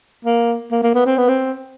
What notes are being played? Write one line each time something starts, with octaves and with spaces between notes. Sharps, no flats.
A#3
A#3
A#3
B3
C4
B3
C4